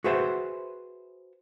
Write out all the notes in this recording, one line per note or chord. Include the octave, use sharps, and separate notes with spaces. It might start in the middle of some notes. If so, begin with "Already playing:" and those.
F#4 G#4 B4 C5 E5 F#5